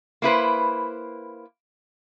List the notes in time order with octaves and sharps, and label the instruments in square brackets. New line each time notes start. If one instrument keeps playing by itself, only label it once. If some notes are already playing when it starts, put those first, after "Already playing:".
[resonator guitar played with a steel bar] A#3 E4 B4 C5